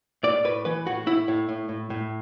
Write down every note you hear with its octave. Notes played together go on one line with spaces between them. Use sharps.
A2 D5
A2 B4
E3 B4
A2 F#4
A2 E4
A2
A2
A2
A2